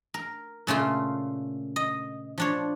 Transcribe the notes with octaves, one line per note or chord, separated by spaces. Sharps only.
A#4
A#2 C#3 A3 F4
D#5
F3 D4 C#5